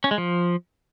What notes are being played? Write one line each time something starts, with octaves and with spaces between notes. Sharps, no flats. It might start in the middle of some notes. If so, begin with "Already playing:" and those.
C#4
G#3
F3